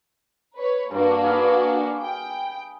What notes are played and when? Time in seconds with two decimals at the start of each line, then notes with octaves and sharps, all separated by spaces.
0.56 B4 C#5
0.91 G2 A#3 D4 F#4
1.24 G#4 B4 F5
2.01 G5